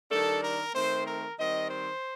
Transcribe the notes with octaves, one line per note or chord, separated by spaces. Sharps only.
D#3 G3 D4 A4
A#4
D#3 A3 C4 C5
A#4
D#3 G3 C4 D#5
C5